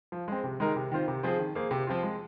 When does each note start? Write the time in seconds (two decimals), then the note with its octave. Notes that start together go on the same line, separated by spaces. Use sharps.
0.12 F3
0.28 G#3 C4
0.44 C3
0.60 D#3 G#3 D#4 A#4
0.76 C3
0.91 D#3 C4 F4 C5
1.08 C3
1.23 F3 C4 G#4 C5
1.39 D#3
1.55 A#3 G#4 C5
1.71 C3
1.87 F3 C4 F4
2.03 G#3